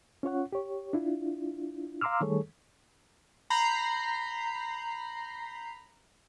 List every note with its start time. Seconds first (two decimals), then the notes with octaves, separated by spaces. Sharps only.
0.23 C#4 F4 C#5 F#5
0.52 G4 C#5
0.93 D4 E4 F4
2.01 F5 A#5 C6 D6 E6 F6
2.21 D#3 G3 A3 G#4 A4 C#5
3.50 A#5 B5 G6 C7